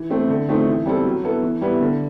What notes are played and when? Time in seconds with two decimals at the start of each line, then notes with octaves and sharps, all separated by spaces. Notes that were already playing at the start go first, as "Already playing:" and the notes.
Already playing: E3
0.10 A3 C4
0.29 D3
0.48 F3 A3 C4 D#4
0.67 E3
0.86 G3 C4 E4 A4
1.05 F#3
1.24 B3 E4 A4
1.42 E3
1.61 G3 B3 E4
1.81 D3